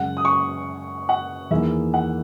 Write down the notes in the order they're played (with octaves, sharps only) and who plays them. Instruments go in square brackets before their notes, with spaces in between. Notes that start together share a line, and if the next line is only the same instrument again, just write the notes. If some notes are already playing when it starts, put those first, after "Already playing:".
Already playing: [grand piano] F#2 C#3 G#3 [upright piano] F#5
[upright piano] D#6
C#6
F#5
[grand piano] E2 D#3 A#3 E4 G#4 [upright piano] E5
[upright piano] F#5